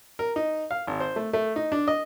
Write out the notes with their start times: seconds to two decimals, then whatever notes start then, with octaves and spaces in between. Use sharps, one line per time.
0.19 A#4
0.36 D#4
0.71 F5
0.87 G#1
1.00 C5
1.16 A3
1.33 A3
1.56 D#4
1.72 D4
1.88 D#5